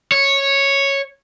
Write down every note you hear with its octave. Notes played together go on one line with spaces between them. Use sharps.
C#5